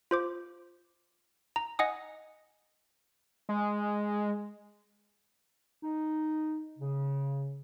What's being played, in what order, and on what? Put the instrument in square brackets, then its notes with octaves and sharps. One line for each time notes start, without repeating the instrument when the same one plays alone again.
[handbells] F4 C5 D6
A#5
D#5 F#5 G#5 D#6
[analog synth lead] G#3
[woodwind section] D#4
C#3